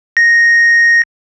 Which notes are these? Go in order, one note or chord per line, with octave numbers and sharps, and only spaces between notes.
A#6